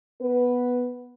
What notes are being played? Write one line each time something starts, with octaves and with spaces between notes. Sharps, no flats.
B3 B4